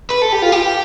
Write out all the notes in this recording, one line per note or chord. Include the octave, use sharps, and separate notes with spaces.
B4
A4
G4
F4
G4